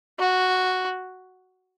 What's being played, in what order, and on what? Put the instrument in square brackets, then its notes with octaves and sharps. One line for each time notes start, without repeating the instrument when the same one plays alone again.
[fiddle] F#4